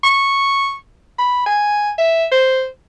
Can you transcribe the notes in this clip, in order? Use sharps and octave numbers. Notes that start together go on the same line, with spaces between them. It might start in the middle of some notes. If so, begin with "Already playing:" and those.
C#6
B5
G#5
E5
C5